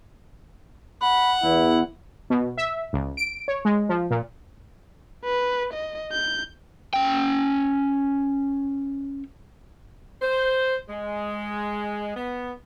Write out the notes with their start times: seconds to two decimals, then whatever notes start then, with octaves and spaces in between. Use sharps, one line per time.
1.02 F#5 B5
1.43 E2 E4
2.30 B2
2.57 E5
2.93 C#2
3.17 D7
3.48 C#5
3.65 G#3
3.89 F3
4.11 A#2
5.24 B4
5.73 D#5
6.12 G6
6.93 C#4 G5
10.22 C5
10.89 G#3
12.16 B3